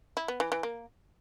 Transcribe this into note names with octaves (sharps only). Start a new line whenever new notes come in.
E4
B3
E3
E3
A#3